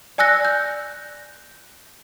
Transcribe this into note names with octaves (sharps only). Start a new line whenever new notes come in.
D5 G#5 E6 F#6 A#6 C#7
G6